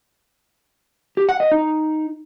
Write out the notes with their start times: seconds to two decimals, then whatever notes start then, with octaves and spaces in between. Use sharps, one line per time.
1.17 G4
1.29 F#5
1.40 D#5
1.51 D#4